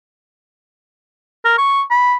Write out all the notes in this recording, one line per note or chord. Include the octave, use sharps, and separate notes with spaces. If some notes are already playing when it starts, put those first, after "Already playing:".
A#4
C#6
B5